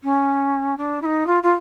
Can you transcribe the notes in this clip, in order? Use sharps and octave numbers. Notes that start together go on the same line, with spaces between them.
C#4
D4
E4
D#4
F4
F4